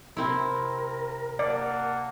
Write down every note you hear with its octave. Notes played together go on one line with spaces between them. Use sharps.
C3 C4 E4 A#4
A#3 D5 F#5 A5